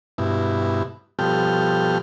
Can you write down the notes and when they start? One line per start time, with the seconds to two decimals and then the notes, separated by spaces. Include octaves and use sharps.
0.18 G2 B2 E4
1.19 B2 F3 G3 A4 G5 F6